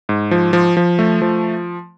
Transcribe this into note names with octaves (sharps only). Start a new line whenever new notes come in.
G#2
F3
F3
F3
A3
F3